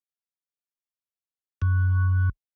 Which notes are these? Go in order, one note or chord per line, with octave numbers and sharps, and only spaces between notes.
F#2